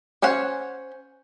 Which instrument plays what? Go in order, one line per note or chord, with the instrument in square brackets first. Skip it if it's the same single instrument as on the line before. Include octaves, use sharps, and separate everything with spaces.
[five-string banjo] C#4 C5 C#5 F#5